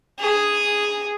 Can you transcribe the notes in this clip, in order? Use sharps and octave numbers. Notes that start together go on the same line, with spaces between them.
G#4